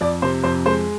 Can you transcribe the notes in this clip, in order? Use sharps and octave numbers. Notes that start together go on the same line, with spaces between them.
F2 D5
C3 C5
F2 C5
G#3 C5